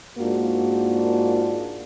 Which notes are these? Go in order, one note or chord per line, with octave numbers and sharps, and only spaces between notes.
G#2 A#3 D4 F4 F#4